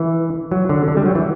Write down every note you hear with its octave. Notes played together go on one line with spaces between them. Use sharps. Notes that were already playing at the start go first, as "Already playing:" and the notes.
Already playing: E3
F#3
D3
D3
G3
F#3
E3